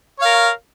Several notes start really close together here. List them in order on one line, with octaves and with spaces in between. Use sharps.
C#5 F5 A#4